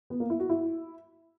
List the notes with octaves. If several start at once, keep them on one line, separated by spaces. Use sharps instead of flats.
B3
A#3
E4
F#4
E4